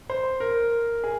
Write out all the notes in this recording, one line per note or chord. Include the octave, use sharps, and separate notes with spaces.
C5
A#4
G#4